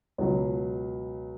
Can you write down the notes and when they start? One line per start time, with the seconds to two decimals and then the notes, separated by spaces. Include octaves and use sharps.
0.18 C#2 B2 F#3